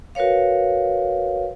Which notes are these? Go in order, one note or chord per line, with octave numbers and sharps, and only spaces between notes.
F#4 A#4 B4 C#5 F5